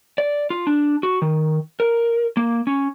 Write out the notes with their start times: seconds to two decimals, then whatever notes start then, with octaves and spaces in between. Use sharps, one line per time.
0.18 D5
0.50 F4
0.67 D4
1.03 F#4
1.22 D#3
1.80 A#4
2.37 A#3
2.67 C#4